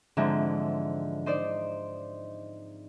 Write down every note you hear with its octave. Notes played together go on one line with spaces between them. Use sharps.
G#2 D3 E3 F3 C4 E4
D#4 C5 D5